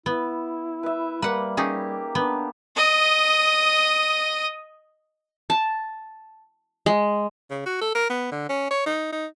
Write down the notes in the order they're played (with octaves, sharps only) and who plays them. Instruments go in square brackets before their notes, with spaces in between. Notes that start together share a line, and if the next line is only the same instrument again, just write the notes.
[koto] B3 [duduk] E4
[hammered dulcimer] B4 E5
[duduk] G3 [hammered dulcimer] A#3 [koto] B4 F#5
[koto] C#4 D#4 G#4 [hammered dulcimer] G4
[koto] B3 [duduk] D4
[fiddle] D#5 D#6
[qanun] A5
G#3
[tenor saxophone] C#3
F#4
A4
A#4
B3
D3
C#4
C#5
D#4
D#4